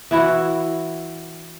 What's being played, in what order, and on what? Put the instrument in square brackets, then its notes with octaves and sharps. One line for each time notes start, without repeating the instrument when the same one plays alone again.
[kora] E3 E4 F#4